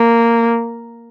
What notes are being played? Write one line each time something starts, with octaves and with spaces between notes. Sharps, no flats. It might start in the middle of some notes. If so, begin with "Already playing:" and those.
Already playing: A#3